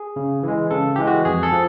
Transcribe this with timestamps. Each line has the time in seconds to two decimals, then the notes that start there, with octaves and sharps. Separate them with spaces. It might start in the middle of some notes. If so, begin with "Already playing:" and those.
Already playing: G#4
0.16 C#3
0.43 E3 G#3
0.71 C#3 A4
0.96 E3 G#3 G4
1.07 F#4
1.25 F2 G#4
1.43 A4
1.52 F3